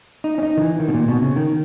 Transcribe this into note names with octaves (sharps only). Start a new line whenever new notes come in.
D#4
C#4
D#4
D#3
E3
D#3
B2
A#2
B2
C#3
D#3